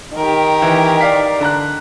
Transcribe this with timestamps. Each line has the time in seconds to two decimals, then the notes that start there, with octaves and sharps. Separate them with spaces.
0.17 D#3 G4 A#4
0.62 E3
1.01 D5 F5 B6
1.40 D3 A#5 F#6